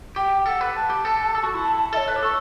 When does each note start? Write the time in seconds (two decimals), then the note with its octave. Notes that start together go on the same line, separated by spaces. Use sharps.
0.16 G4 G5
0.45 A4 F#5 G5
0.61 B4
0.76 A5
0.90 G4
1.05 A4
1.35 A4
1.43 F#4
1.54 E4
1.63 A5
1.93 A4 E5
1.96 C#5
2.08 B4
2.16 G4
2.23 A4 C#6